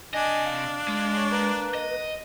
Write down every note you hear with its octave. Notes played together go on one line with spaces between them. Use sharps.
C3 D4 D#5 G#5
F5
G#3
C#5
A#3 B4
D#5